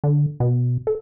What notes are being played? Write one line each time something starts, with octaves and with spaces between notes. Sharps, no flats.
D3
B2
A4